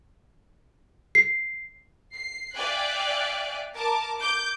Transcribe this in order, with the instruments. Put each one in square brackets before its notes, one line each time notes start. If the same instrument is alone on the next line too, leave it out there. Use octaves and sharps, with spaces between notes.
[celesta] C7
[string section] C7
D5 E5 F5 G5 G#5 F#6
A#4 A5 D6
D6 G6